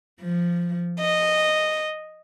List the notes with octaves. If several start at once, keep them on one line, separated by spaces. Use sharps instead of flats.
F3
D#5